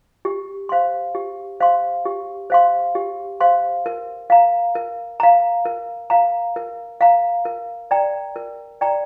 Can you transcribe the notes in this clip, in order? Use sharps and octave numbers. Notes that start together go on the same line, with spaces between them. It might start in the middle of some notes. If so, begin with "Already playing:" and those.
G4
C5 F5 C6
G4
C5 F5 C6
G4
C5 F5 C6
G4
C5 F5 C6
A#4
F5 A#5
A#4
F5 A#5
A#4
F5 A#5
A#4
F5 A#5
A#4
D5 G5 A#5
A#4
D5 G5 A#5